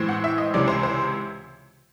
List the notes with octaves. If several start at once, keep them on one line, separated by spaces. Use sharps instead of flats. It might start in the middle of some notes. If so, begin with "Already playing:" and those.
Already playing: A2 E3 G#3 C4
F#5
E5
D#5
C#2 C3 E3 G#3 C#4 D5
C5
C5